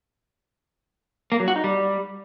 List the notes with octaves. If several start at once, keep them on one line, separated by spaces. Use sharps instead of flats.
A#3
F#3
F#4
D#4
G3